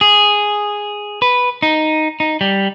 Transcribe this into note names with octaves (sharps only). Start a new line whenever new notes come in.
G#4
B4
D#4
D#4
G3